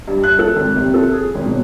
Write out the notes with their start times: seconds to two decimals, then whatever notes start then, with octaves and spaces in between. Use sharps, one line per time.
0.08 G2
0.24 F#6
0.39 A4
0.56 G#1
0.76 C3
0.94 A4
1.13 G#4
1.35 G#1
1.46 E1